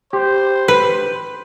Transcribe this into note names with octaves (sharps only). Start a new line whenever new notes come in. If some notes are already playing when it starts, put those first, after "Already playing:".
G4 C5
B4